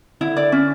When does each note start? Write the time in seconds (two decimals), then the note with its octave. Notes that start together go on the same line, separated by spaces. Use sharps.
0.21 D3 E4
0.37 D5
0.52 C#4